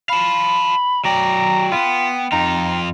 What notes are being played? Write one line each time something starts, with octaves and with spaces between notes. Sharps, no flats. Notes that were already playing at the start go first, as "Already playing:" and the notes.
F5 A5 B5
F#3 D5 G5 A#5
B3 F4
F2 D#4 F4